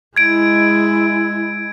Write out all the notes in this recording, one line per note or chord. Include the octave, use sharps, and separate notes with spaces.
G#3 E4 G#6 D7